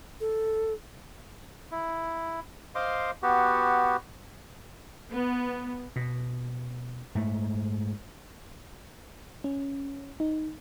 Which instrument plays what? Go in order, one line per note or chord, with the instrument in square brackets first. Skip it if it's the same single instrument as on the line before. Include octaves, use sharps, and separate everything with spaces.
[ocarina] A4
[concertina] E4
C5 D#5 F5 C6 D6
B3 F#4 G4
[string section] B3
[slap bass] B2
G#2 A3
[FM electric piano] C#4
D#4